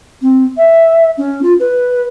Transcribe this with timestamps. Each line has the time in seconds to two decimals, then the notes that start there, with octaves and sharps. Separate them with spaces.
0.22 C4
0.57 E5
1.18 C#4
1.43 F4
1.60 B4